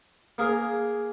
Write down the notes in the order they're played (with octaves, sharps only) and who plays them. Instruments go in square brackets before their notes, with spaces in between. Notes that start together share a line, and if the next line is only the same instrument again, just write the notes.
[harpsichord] A#3 G#4 A#4